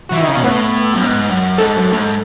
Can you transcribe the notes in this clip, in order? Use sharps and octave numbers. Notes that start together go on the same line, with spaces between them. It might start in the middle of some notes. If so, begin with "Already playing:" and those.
E3 F#4
D#3 E4
C#3 D#4
B2 C#4
A2 B3
F#2
G#2
F#2
G#2 A4
F#2
A2
G#2